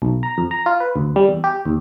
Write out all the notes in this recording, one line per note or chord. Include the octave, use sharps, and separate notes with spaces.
B1
A#5
F2
A#5
F4
B4
D2
G3
E2
G4
D#2